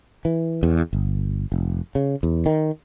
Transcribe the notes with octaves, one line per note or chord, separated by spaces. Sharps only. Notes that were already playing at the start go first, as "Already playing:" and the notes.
E3
E2
G1
F1
C#3
E2
D#3